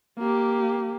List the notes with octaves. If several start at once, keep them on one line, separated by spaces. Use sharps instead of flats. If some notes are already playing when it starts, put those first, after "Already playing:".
A#3 G4